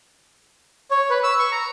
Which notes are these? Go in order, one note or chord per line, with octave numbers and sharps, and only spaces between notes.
C#5
B4
E6
C#6
A#5